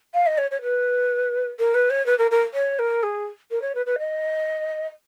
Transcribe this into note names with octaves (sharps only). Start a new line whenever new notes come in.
F5
D#5
C#5
C#5
B4
A#4
B4
C#5
B4
A#4
A#4
C#5
A#4
G#4
A#4
C#5
B4
B4
D#5